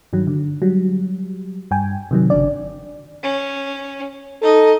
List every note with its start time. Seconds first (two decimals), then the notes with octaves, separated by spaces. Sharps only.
0.13 G2 D#3 F#3
0.27 D3
0.62 F#3 G3
1.71 G2 G5 G#5
2.11 C3 D#3 F#3
2.30 G1 C#3 D4 D5
3.23 C#4
4.42 D#4 A4 D#5